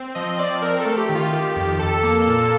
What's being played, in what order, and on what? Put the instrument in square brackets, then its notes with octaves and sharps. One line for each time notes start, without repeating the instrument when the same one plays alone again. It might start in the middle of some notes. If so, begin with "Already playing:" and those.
Already playing: [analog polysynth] C4
F3 D#5
C4 D5
C4 A#4
A4
A3
G4
D#3
F4
D#3 G4
F2 G4
F2 A4
A#3
A#2